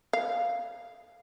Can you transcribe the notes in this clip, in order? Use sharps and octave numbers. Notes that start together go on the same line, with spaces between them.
F5